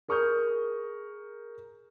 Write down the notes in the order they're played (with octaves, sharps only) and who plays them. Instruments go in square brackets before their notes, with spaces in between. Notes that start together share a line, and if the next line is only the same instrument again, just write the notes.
[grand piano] G#4 A#4 C#6 D#6 F6 G6